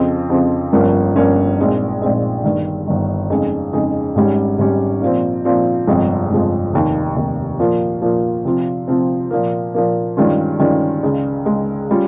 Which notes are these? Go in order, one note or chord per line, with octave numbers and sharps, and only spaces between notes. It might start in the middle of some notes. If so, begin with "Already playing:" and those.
Already playing: F2 C#3 F3 C4
F2 C#3 F3 C4
G1 G2 F3 A#3 C#4
G1 G2 F3 A#3 C#4
A#1 A#2 G#3 C4 D#4
A#1 A#2 G#3 C4 D#4
G1 G2 D#3
G1 G2 D#3
F2 C#3 G#3 D#4 G#4
F2 C#3 G#3 D#4 G#4
G#1 G#2 G3 C#4 G4
G#1 G#2 G3 C#4 G4
A#2 F3 C4
A#2 F3 C4
G1 F2 C3 F3 G#3
G1 F2 C3 F3 G#3
F1 D#2 D#3
F1 D#2 D#3
A#2 F3 A#3 F4
A#2 F3 A#3 F4
C3 F3 C4 F4
C3 F3 C4 F4
A#2 F3 A#3
A#2 F3 A#3
G2 D#3 G#3 C#4 F4
G2 D#3 G#3 C#4 F4
C#2 C#3 G#3
C#2 C#3 G#3
G3 C#4 F4